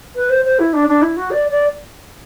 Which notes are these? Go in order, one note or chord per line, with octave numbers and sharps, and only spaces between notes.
B4
C5
C5
E4
D4
D4
E4
F#4
D5
D5